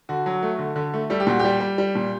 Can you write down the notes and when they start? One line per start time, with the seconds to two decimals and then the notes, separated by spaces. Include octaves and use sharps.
0.09 D3 F#4
0.26 F#3
0.43 A3
0.59 D3
0.76 D3
0.94 A3
1.10 G3 A4
1.20 G4
1.27 A#2 F#4
1.39 G4
1.44 G3
1.60 G3
1.78 G3
1.95 A#2